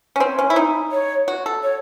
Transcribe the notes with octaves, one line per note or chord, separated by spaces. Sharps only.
C#4
C4 C#5
C#4
E4
D#4
C#5
F#4
A4
C#5